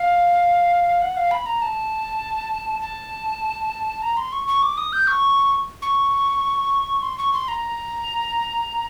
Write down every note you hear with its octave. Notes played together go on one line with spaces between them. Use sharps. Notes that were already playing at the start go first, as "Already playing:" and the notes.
Already playing: F5
F#5
F5
B5
A#5
A5
A5
A#5
C6
C#6
C#6
D6
D#6
G6
C#6
C#6
C6
C#6
C6
A#5